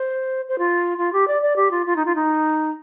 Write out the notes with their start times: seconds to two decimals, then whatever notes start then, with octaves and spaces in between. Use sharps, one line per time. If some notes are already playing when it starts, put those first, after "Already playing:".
Already playing: C5
0.49 C5
0.59 F4
0.98 F4
1.13 G4
1.28 D5
1.42 D5
1.56 G4
1.71 F4
1.86 F4
1.96 D#4
2.06 F4
2.15 D#4